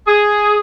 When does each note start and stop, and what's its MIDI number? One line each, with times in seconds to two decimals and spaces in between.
0.08 0.57 68